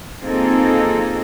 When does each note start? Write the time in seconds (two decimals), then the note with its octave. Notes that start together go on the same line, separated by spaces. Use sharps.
0.23 A#3 C4 D#4 F4 G#4 A4